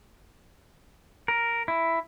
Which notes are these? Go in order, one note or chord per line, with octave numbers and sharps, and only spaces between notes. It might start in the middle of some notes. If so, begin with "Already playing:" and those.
A#4
E4